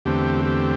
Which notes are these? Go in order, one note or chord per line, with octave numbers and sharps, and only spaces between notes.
E2 D3 A3 C4 G4
G4